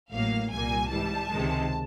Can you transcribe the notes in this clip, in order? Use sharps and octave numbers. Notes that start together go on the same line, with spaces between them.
A1 A2 F#3 A#3 F5
C2 A#2 G3 A#3 G#5
G#2 E3 G3 A5
C#2 C3 D#3 G#3